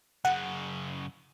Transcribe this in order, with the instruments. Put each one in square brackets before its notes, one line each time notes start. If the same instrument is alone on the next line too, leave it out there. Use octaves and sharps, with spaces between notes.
[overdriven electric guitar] F#2 C#3 [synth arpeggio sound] F#5